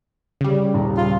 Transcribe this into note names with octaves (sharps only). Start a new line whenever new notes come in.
C#3 G3
D#1 A#2 A#5
F4